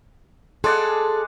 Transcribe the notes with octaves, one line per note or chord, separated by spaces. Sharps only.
G#3 G#4 A4 D5 F#5